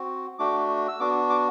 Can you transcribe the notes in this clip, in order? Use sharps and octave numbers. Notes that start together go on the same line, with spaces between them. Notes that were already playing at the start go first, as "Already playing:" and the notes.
Already playing: C4 F#4
A3 D4 F#4 D6
E6
B3 D4 F#4 D6
D6